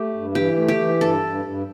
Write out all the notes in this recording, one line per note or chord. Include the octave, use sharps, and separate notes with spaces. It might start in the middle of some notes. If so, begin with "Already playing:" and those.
Already playing: A3 G4
G2
E3 G4
A3
G4
E3
G2 A4
G2
G2